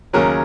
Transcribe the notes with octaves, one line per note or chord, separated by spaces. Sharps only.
D#2 C#3 F#3 A#4 C#5